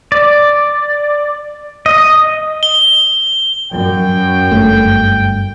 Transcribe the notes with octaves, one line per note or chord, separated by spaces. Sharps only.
D5
D#5
G7
F#2 G5
G1 A3